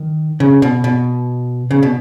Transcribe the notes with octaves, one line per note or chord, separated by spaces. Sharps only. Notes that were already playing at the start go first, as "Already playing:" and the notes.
Already playing: D#3
C#3
B2
B2
C#3
B2